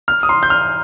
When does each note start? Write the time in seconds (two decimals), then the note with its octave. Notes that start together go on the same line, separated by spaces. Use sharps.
0.08 F6
0.23 D#6
0.29 C6
0.43 G6
0.50 F6